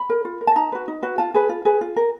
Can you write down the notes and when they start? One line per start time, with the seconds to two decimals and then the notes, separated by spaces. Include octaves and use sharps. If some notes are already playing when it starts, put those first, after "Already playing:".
Already playing: B5
0.09 A#4
0.25 F4
0.41 A#4
0.47 A5
0.56 D#4 A#5
0.72 F#4 B4
0.88 D#4
1.02 F#4 B4
1.18 F4 A5
1.34 G#4 B4
1.49 F4
1.65 G#4 B4
1.81 F4
1.96 A#4